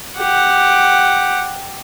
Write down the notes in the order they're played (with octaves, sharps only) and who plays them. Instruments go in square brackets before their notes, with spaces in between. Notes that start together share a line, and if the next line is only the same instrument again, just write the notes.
[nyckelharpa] G4 F#5